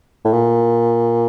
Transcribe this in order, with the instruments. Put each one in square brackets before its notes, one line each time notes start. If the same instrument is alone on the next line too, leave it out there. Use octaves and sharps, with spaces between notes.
[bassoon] A2
A#2